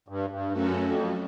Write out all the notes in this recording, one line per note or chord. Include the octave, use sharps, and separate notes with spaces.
G2
G2
F#2 F#3 A3 C#4 F#4 A4
F2